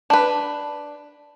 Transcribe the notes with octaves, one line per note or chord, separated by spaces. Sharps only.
D4 B4